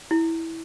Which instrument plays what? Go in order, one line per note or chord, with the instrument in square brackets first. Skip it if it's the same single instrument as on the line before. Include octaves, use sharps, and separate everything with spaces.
[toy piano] E4